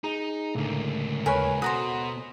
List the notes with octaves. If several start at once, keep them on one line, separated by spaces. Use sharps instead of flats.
D#4 G#4 A#5
C#2 A2 D3 A3 A#3
D#2 A#4 B4 C#5 G#5
B2 F#4 A4 C5 A#5 D#6